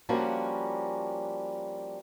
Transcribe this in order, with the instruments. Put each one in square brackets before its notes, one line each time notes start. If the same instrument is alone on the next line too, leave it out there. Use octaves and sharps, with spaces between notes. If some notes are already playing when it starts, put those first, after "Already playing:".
[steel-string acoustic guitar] F3 G3 A#3 C#4 D4 F#4